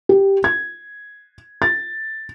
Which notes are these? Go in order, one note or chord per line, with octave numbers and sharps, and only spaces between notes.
G4
G#6
A6